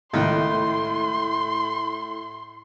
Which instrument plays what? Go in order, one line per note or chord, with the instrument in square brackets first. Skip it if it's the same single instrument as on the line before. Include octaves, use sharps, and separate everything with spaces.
[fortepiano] C#2 D#3 [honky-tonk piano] A2 [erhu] C6